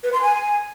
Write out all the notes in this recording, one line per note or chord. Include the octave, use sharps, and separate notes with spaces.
B4
C6
G#5